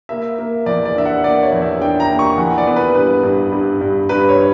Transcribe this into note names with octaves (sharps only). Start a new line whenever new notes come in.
A#3 E5
A#3
E2 D5
D5
D4 E5
F#5
A#3 D5
C#5
E2
E5
D4 G5
A#5
A#3
C#6
E3 F#5
D5
B3
B4
G2 B4
G2
G2
G2
G2 B4
C#5